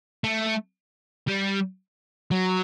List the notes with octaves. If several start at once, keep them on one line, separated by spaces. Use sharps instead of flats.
A3
G3
F#3